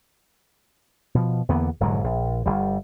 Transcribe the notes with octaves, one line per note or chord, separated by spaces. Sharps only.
B2 F3
E2 D3 A#3 B3
F1 G#2 D3 F#3
A#1
G1 G3